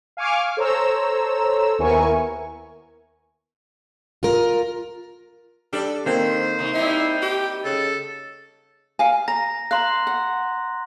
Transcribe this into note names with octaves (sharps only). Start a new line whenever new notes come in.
F5 G#5 C#6 D6 F6
A4 C5 C#5 A#5 E6
D#2 B3 E4 A#4 G#5 C#6
F4 A#4
G3 D4 A4 D5
D#3 A#3 C4 A4 C5
C3 D#4
G3 D#4 E4
G4
C#3 A4
F5 G#5
A#5 A#6
F5 A#5 C6 F#6
F#5